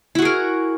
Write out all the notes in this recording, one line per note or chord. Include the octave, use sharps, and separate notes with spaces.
E4 F#4 G#4 A#4